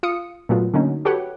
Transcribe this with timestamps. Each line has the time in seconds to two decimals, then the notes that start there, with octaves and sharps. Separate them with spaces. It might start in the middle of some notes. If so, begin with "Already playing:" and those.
0.03 F4 F5 D#6 C#7
0.49 A#2 F#3 A3 B3 F4 F#4
0.74 D3 F#3 A3 A#3 C#4 D#4
1.05 F#4 G4 A4 B4 C#5 F#5